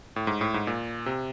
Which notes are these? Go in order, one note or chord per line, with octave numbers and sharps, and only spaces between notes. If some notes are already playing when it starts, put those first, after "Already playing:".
A2
G#2
A2
G#2
A#2
C3